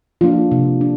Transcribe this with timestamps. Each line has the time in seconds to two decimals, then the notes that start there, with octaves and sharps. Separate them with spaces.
0.21 F3 A#3 D4 F4
0.52 C3
0.81 D4